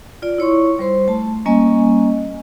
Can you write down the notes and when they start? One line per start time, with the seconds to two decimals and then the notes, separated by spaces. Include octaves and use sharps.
0.22 F4 D5
0.38 E4 C#5 C6 C#6
0.79 G3 C5 C6
1.08 A3 A5
1.46 G3 A#3 C#4 D#5 G#5